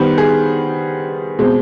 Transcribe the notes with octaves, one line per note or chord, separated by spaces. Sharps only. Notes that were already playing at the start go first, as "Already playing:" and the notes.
Already playing: D#3 G3 B3 C5
G#4
B2 G#3 C4